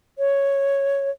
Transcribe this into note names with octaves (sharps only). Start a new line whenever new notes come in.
C#5